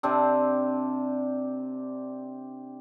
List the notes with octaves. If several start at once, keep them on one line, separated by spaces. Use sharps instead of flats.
C3 C4 D4